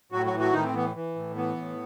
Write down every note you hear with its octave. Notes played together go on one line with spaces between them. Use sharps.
A2 F#3 F#4
F#3 F#4
E3
F#3 F#4
A2 D#3 D#4
C4
E3 B3
E3
A2
E3 B3
A2